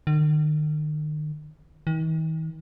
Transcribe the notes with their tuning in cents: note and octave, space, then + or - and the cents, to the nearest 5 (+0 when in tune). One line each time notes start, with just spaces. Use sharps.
D#3 -40
D#3 +45